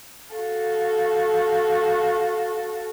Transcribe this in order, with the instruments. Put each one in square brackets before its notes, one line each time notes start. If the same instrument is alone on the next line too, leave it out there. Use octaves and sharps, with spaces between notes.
[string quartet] F#4 A4 F5